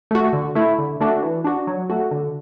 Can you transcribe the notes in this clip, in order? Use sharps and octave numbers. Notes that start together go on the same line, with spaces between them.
A3 F#4
D3
A3 E4
D3
A3 D4 F#4
E3
D4 F#4
F#3
A3 F#4
D3